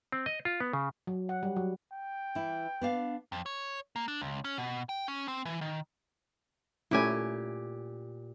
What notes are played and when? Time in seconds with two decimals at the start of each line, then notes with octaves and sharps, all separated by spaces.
0.12 C4
0.26 D#5
0.45 F4
0.60 B3
0.73 C#3
1.07 F#3
1.29 F#5
1.43 G3
1.56 F#3
1.92 G5
2.35 E3 E4
2.81 B3 D4 F5
3.32 F2
3.46 C#5
3.96 A#3
4.08 D4
4.21 C#2
4.44 C#4
4.58 B2
4.89 G5
5.08 C#4
5.28 C4
5.45 E3
5.61 D#3
6.91 A#2 A3 C#4 E4 G4 G#5